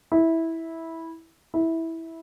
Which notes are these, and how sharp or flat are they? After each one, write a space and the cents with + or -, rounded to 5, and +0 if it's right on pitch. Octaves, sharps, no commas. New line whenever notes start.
E4 -10
E4 -10